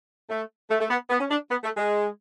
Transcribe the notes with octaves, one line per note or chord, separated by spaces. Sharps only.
A3
A3
A3
B3
B3
C#4
D4
B3
A3
G#3